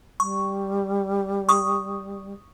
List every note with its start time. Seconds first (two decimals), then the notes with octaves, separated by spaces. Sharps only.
0.20 G3 C#6
1.49 C#6 D#6